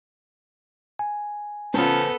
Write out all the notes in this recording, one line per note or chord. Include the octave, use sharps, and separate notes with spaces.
G#5
B3 C#4 F4 A4 B4 C5 A5